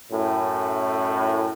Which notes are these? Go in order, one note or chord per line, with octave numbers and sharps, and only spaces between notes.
F#2 A2